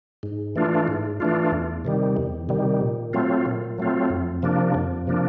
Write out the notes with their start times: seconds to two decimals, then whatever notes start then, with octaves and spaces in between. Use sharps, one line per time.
0.23 G#2
0.56 E3 A3 D4 F4
0.88 G#2
1.20 E3 A3 D4 F4
1.52 E2
1.85 C3 D#3 G3
2.17 E2
2.49 C3 D#3 G3
2.81 A#2
3.13 F#3 A3 C4 F4
3.46 A#2
3.78 F#3 A3 C4 F4
4.10 F2
4.42 C3 F3 A#3 D4
4.74 F2
5.07 C3 F3 A#3 D4